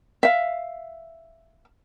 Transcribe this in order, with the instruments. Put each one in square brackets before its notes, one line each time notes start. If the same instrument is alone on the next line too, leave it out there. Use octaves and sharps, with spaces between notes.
[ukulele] E5 F5